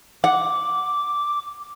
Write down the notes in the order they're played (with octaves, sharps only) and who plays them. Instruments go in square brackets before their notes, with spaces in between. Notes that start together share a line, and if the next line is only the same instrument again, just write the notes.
[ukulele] F#5 [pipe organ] D6